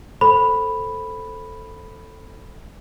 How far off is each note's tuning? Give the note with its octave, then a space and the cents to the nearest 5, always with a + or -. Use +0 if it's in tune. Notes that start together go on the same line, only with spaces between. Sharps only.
A4 +0 C5 +0 B5 +0